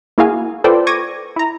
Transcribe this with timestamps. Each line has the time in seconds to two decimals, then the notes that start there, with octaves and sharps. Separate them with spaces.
0.18 A#3 E4 F#4 G#4 F5 G#5
0.64 F4 A4 B4 C5 D5 G5
0.87 C#6 D6 G#6 A#6 D#7
1.36 E4 A#5